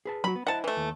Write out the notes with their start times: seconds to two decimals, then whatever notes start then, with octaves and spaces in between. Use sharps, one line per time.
0.05 G#4 B4 A5
0.24 F#3 F#4 B5
0.35 B3
0.47 E4 C5 D#5 F#5 A5
0.64 E3 A3
0.77 D#2